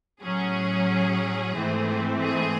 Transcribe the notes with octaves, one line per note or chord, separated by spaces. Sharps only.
A2 F#3 C#4 G#4
G#2 E3 A3 C4
G#4